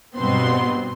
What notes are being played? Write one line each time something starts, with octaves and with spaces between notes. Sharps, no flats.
G2 B2 B3 C4 C6